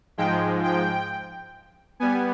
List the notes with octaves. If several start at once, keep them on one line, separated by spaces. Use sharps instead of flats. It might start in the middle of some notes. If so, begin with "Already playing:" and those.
G#2 F3 G#3 G5
G5
G3 B3 G#5